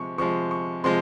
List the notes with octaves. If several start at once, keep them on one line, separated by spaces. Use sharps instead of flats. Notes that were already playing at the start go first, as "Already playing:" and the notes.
Already playing: C3 F3 G#3 C#6
C3 F3 G#3 C#6
C#6
C3 F3 G#3 C6